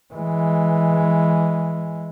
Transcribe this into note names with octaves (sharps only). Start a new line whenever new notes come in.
E3 G#3